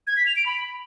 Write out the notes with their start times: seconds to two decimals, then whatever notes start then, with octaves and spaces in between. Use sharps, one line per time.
0.07 G#6
0.17 B6
0.27 F7
0.36 D7
0.46 B5